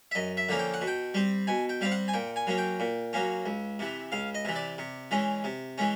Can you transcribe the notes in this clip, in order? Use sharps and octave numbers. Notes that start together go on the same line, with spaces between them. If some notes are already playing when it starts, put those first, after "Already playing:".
E5
F#2 D#5
E5
D3 F3 A#3 C#4
G5
F#5
B2
G5
G3 C4
B2 G#5
G5
G3 C4 F5
F#5
G#5
A#2 G5
G#5
F#3 A#3 C#4
G5
A#2
F#3 A#3 C#4
C#2
C3 E3
C#2 F5
D#5
C3 E3
D5
C3
E3 G#3 C#4
C3
E3 G#3 C#4